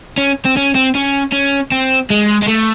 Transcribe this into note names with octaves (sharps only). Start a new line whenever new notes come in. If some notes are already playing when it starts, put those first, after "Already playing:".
C#4
C4
C#4
C4
C#4
C#4
C4
G#3
G#3
A3